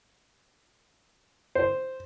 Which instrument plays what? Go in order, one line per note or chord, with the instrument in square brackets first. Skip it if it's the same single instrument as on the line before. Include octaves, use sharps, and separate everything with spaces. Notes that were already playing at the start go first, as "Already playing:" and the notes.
[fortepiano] C5